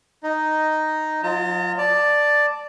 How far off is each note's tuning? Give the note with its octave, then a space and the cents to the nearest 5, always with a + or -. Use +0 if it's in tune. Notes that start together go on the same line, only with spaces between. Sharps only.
D#4 +0 D#5 +0
F#3 -40 F4 +0 A#5 -45
D5 +5 A5 +0